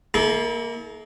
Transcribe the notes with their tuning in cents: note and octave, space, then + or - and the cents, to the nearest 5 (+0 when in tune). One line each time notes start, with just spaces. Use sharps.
A#3 +0 E4 -40 A4 -45